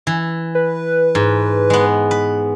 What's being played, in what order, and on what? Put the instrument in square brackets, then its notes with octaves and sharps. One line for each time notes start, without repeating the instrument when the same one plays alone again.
[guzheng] E3
[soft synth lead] B4
[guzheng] G#2
G#3 B3
B4